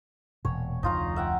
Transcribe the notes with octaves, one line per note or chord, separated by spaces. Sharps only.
E1 A#2 C#5
F1 D2 D#4 F4 A#5
E5 F#5 G5